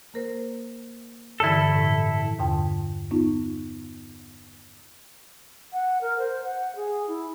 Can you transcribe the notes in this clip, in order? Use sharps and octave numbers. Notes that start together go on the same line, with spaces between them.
A#3 A#4 C5
G2 D3 E3 E4 A4
A2
E2 G2 B2 D3 G5 A5
B3 D#4 F4
F#5
A#4
C5
F#5
G#4
E4